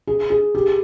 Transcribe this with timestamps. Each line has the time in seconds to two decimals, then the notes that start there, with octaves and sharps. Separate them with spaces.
0.07 G#4
0.30 G#4
0.55 G4